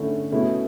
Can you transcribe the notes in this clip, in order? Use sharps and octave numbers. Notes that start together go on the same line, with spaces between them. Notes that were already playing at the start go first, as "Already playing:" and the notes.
Already playing: D3 A3 C#4 E4
B2 A3 C#4 E4